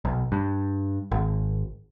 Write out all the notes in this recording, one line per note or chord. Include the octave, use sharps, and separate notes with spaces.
B1
G2
G#1